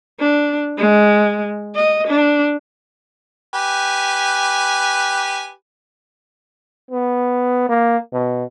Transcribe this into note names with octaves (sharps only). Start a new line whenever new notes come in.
D4
G#3
D#5
D4
G4 B4 G#5
B3
A#3
B2